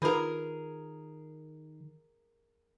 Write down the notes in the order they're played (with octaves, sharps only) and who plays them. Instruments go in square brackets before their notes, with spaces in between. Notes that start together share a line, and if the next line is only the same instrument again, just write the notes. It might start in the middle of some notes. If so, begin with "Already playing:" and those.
[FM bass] D#3 [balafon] F4 B4 B5 [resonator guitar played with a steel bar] G#4 A#4